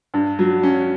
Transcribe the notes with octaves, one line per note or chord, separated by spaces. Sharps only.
G2
F#3
C#4